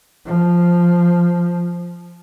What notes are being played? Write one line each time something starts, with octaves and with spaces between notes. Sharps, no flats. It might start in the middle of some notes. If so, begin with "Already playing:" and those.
F3